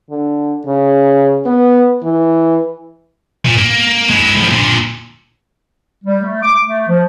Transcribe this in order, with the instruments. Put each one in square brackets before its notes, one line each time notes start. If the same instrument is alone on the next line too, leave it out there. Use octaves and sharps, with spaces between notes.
[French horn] D3
C#3
B3
E3
[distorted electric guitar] A#2
A#3
G#3 E4
A2 F3
A#2 D3
[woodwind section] G3
A3
D6
A3
F3